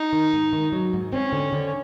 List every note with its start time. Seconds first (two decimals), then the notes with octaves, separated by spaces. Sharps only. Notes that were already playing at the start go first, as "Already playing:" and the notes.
Already playing: D#4
0.13 D#3
0.33 G#2
0.53 D#3
0.73 F#3
0.93 G#2
1.13 C4 C#4
1.32 D3
1.53 D3